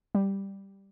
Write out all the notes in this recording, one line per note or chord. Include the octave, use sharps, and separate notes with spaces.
G3